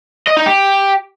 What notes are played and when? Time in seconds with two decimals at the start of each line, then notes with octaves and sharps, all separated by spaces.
0.27 D#5
0.37 D#4
0.46 G4